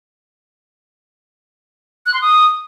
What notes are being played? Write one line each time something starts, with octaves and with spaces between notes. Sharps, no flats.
F#6
C6
D#6